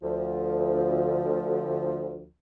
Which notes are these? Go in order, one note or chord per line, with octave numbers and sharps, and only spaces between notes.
D2 F3